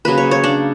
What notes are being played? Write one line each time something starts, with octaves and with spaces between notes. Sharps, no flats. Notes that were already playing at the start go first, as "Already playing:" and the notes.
C#3 F#3 A#3 B4
C#5
C#5
D4